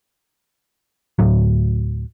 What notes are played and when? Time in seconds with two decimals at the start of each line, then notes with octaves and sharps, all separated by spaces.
1.19 D2 A2 F#3